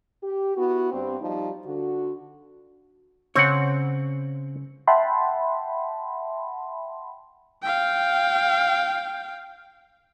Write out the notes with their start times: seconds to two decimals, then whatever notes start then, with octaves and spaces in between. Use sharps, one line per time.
0.23 G4
0.56 B3 E4 F#4
0.92 G2 G3 C4
1.20 F3 G3 D#4
1.66 D3 F#4
3.36 C#3 C4 C#5 F#5
4.87 E5 F#5 G5 A5 B5 C6
7.63 F5 G5